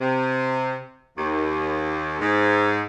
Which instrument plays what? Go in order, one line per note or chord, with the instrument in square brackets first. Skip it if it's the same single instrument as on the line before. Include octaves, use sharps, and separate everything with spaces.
[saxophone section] C3
D#2
G#2